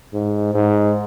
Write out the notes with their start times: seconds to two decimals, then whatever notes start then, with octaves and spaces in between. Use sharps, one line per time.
0.13 G#2
0.54 G#2